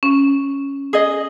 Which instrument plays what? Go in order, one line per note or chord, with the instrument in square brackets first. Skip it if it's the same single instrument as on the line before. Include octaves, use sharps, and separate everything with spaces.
[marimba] C#4
[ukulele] G#4 D#5